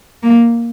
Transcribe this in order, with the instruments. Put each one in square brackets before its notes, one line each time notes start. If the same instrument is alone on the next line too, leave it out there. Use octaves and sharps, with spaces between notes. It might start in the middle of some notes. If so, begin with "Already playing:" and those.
[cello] A#3